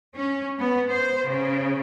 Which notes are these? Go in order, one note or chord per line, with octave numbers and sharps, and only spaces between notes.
C#4
B3
C5
C#3